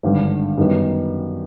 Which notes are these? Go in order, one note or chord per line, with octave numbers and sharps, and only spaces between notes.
G#1 G2 D3 G3
F#2 D#3 G3 B3